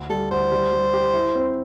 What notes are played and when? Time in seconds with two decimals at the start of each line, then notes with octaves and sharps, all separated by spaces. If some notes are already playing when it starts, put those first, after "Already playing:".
Already playing: D2
0.09 G3 A4
0.31 D2 C5
0.52 G3
0.72 G3
0.93 G4
1.14 E4
1.35 C4